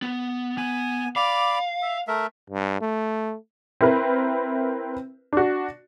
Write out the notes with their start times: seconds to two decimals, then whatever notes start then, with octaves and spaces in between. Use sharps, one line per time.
0.02 B3
0.58 B3 G#5
1.16 D5 F5 B5 D6
1.82 E5
2.08 A3 A#4 E5
2.50 G2
2.81 A3
3.81 C4 E4 A#4 B4
5.33 D4 F#4